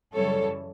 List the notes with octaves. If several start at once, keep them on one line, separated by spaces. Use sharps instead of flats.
F#2 C#3 E3 G3 A4 C#5